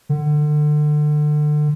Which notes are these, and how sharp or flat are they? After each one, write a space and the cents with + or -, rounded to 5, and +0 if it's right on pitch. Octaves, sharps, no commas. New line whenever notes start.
D3 +30